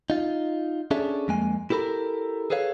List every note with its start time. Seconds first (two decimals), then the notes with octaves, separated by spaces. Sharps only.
0.10 D#4 F4
0.91 C#4 D4 G#4 A4 E5
1.28 F2 G#3 A#3 G#5
1.70 E4 G4 A4 A#4 B5
2.50 G#4 A4 B4 C#5 F5